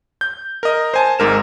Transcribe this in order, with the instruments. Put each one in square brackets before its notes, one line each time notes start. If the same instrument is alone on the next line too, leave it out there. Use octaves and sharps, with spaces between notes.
[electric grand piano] G6
A#4 D#5
C5 G#5 A5
G#1 G#2 A#4 E7